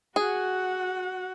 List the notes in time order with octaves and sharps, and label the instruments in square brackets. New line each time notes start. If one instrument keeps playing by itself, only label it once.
[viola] F#4 F#5 [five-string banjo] G#4